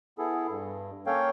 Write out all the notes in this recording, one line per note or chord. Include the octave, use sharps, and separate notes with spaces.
B3 E4 G#4 A4
G2
A#3 C#4 A4 C#5 F5 G5